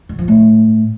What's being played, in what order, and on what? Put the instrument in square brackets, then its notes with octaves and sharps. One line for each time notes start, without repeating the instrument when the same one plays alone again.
[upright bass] D3
F3
A2